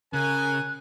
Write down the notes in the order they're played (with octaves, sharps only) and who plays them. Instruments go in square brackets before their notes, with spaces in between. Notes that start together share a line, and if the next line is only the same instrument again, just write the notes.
[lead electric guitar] C#3 [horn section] A#4 G#5 [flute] F#6